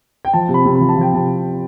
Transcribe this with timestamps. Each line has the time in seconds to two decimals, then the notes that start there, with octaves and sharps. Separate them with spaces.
0.25 G5
0.33 F3 A5
0.48 C3
0.54 B5
0.65 C3
0.75 B5
0.81 F3
0.89 A5
0.96 F3 G5
1.13 C3 A5